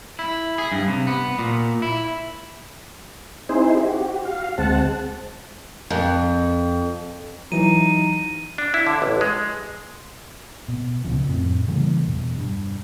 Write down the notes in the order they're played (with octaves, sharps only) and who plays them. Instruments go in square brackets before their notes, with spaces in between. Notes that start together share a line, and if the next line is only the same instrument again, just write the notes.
[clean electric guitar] E4
G#4
G2
C3
B3
A#2
E4
[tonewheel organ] C4 D#4 E4 G#4 C5
F#4 G4
F#4 F5
D2 G#3 C4 F#5 A5
[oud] F2
[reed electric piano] E3 F#3 [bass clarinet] D#4 [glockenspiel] D#7
[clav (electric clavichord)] D4
E4
D3
A1
G#3
[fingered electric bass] B2
C#2 C#3 F3
F2 A2 C4
C#3 E3 G3 A#3
E2 B2
G2